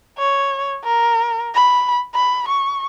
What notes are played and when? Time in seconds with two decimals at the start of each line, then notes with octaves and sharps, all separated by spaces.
0.18 C#5
0.84 A#4
1.54 B5
2.14 B5
2.48 C#6